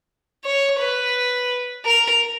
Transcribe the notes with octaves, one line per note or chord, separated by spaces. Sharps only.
C#5
B4
A#4